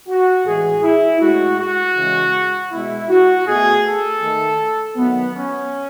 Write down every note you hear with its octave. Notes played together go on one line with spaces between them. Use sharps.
F#4
A2 E3 G#3 G#4
E4
A2 G#3 F#4
F#4
C#3 E3 G#3
B2 G#3 E4
F#4
B2 A3 G#4
A4
D#3 A3
D#3 F#3 A3 B3
C#4